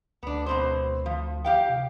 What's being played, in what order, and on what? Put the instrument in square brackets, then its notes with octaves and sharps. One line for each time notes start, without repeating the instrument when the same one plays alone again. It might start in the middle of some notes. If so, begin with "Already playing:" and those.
[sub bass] D2 [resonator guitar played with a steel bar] B3 D4
[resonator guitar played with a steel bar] B2 C4 C5
F3
G4 F5 G5
[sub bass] C3